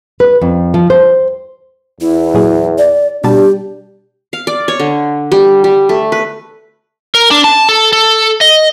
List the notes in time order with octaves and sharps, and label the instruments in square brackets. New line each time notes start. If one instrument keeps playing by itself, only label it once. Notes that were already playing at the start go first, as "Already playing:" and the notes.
[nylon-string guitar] B4
F2
F3
C5
[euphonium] E2 [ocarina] E4
[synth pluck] A#2 F#3 G#4
[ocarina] D5
[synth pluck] B2 G3 A5 [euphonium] D4 [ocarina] G4
[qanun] F5
D5
C#5
D3
G3
G3
A3
B4
[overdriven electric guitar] A#4
D4
A5
A4
A4
D#5